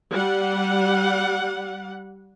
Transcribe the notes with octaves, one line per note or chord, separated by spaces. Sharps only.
G3 F#5